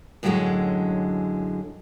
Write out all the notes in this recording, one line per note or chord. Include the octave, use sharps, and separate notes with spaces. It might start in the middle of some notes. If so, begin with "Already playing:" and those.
F#2 A2 D3 F#3 G#3 C#4